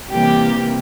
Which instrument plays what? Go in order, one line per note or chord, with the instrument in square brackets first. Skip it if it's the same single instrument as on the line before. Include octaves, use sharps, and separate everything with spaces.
[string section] C3 E3 G3 A#3 G4